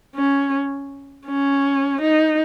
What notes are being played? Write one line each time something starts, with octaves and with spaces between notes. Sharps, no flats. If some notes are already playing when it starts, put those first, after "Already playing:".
C#4
C#4
D#4